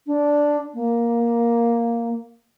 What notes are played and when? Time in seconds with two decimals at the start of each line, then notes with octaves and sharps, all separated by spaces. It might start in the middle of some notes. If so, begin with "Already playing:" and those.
0.07 D4
0.74 A#3